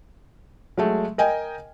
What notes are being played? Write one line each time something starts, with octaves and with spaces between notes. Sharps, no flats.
F#3 G#3 A3
A#4 D#5 G5 G#5